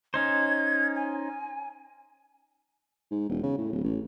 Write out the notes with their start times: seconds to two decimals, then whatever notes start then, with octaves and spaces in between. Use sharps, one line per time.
0.14 C#4 D#4 C5 G#6
0.96 G#5
3.11 G#2
3.29 E1
3.43 C#3
3.58 A2
3.72 D1
3.84 A1